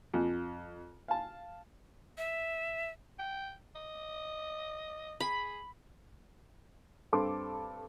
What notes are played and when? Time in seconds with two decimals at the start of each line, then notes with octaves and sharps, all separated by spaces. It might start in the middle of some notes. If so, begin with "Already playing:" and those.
0.14 F2
1.08 F5 A5
2.18 E5
3.19 G5
3.75 D#5
5.20 G#4 B5
7.13 G2 C4 A4 C6 D6